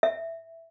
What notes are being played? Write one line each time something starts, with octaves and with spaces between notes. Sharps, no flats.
E5